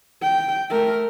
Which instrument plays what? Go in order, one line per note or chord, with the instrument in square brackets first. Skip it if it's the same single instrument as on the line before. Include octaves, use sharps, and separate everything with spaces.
[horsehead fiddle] G5
A3 A#4